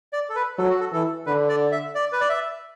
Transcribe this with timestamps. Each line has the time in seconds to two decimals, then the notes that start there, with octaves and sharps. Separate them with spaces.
0.13 D5
0.29 A4
0.35 B4
0.58 F#3 A4
0.69 F#4
0.80 A4
0.93 E3 A4
1.26 D3 B4
1.49 D5
1.72 E5
1.95 D5
2.12 B4
2.21 D5
2.29 E5